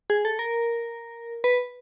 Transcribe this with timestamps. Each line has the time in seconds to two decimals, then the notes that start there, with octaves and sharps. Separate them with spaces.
0.10 G#4
0.25 A4
0.39 A#4
1.44 B4